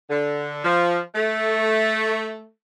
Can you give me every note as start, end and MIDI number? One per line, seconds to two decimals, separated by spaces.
0.09 0.62 50
0.64 0.98 53
1.15 2.52 57